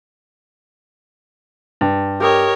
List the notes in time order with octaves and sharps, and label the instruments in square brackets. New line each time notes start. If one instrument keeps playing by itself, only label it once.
[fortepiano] G2
[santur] G4 D#5 [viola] A#4 C#5